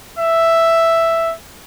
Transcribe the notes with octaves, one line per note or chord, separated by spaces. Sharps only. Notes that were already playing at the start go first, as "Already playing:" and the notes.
E5